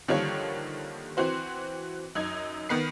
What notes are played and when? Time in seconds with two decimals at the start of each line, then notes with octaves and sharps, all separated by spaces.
0.08 D3 D#3 F3 G3 A#3 C#5
1.17 E3 C4 F#4 C5
2.15 F#2 D#4 G#6
2.69 D#3 B3 B4 C7